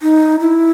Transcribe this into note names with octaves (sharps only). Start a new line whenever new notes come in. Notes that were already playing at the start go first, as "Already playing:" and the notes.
D#4
E4